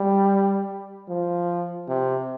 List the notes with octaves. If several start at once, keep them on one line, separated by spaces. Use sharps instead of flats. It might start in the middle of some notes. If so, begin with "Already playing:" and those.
Already playing: G3
F3
C3